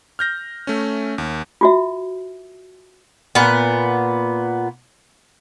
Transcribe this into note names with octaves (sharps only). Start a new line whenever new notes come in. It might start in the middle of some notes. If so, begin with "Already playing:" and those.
F6 G6 A#6
A3 C#4
D#2
F4 F#4 E5
A#2 B3